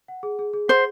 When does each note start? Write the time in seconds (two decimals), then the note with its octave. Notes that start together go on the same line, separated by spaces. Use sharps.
0.08 F#5
0.23 G#4
0.39 G#4
0.53 G#4
0.68 C5 F#5